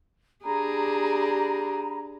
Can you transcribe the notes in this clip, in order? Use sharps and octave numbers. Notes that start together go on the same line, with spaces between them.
D4 G4 G#4 A#5 B5